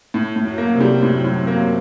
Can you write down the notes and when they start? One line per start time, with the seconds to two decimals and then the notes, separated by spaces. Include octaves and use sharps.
0.14 A2
0.36 A2
0.43 F#2 F#3
0.58 A#3
0.73 C3 C4
0.81 G3
1.03 A2
1.24 A2
1.47 A#3